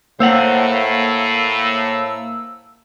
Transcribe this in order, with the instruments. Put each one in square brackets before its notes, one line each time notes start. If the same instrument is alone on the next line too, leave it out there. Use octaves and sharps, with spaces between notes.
[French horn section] A2 [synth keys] A#3 [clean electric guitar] C5 C#5 F#5 [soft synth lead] E6